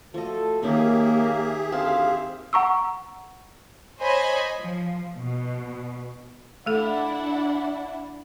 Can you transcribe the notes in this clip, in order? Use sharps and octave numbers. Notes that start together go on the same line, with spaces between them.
F3 A3 F#4 A4 D#5
D#3 A#3 C#4 D#4 G4 G#4 E5
D2 C4 F5 A5
F#5 A#5 C#6 E6
C5 C#5 D#5 G#5 B5
F3
B2
A3 D4 E4 A4 F#5